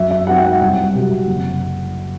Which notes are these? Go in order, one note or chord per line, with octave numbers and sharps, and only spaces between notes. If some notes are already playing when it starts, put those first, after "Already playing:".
Already playing: F#2 E5
E5
F#3 C4 D#4 F#5
G5
F#5
C2 F#5
C3 F#3
F#1